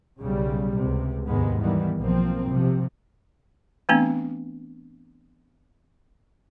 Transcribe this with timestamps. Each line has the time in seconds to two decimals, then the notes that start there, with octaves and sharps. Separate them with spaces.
0.20 B1 C#3 G3
0.78 C#2 C3
1.26 D#2 G#2 C3 D#3 G#3 B3
1.60 D#3 E3 G3 B3
1.98 B1 F3 A#3 C4
2.48 C3 F3
3.89 E3 A3 B3 C4 D4